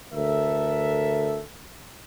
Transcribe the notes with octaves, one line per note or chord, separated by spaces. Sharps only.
D2 A4 A#4 E5